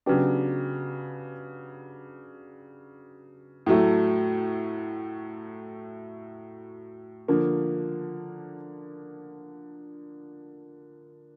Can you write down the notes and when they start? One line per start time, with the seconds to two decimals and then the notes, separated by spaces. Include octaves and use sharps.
0.06 C#3 F#3 B3 D4 G4
3.66 A2 F#3 A3
7.28 D3 F3 A#3